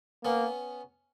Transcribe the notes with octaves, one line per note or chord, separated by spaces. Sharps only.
A#3 B3 C#4